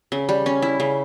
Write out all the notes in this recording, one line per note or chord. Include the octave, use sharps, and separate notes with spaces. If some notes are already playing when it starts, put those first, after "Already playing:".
C#3
G3
C#4
E4
C#3